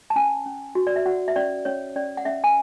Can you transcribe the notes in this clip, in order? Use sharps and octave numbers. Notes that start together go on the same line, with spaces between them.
A5
C#4 G#5
C#4
F#4
D5
E5
F#4 F#5
E5
C#4 D5
C#4 C#5
C#4 D5
F#5
C#4 E5
G#5